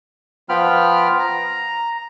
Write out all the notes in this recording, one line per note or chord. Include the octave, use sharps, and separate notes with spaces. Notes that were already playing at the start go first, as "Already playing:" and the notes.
F3 B3 F4 G5 B5 F6
A#5